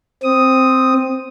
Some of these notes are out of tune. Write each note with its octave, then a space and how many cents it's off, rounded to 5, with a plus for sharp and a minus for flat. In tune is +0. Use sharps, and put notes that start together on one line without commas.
C4 +0 D#6 +0